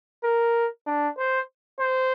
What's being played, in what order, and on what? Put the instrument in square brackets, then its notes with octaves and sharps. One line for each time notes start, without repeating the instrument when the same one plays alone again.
[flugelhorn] A#4
D4
C5
C5